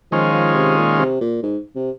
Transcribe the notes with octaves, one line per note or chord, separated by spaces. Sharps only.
D#3 F3 G#3 C#4 F4
F3
C3
A#2
C3
A#2
G#2
C3